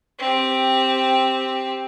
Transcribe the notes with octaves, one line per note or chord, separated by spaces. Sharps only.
C4 G4